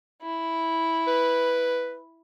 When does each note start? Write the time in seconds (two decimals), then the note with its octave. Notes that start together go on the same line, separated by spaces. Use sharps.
0.22 E4
1.08 B4